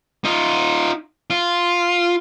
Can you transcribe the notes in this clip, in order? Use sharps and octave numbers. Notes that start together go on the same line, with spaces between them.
D#4 F4
F4